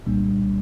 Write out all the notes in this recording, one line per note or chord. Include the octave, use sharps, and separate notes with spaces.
C2 A#2 G3 A#3 D4